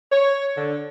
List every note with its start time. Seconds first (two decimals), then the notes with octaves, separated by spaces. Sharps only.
0.12 C#5
0.57 D3